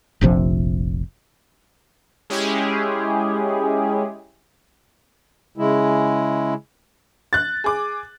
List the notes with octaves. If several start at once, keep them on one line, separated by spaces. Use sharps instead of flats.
F1 A#1 C3 F3
G#3 C#4 E4 G4 G#4
C#3 G#3 E4
F#6 A6
G#4 D6